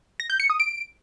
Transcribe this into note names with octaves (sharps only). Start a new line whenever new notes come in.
A#6
G6
C#7
D#6
D7